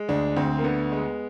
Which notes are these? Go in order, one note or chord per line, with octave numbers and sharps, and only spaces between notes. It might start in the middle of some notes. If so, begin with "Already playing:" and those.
Already playing: G#3
D2 D4
D2 C4
A#3
D3 B3
G#3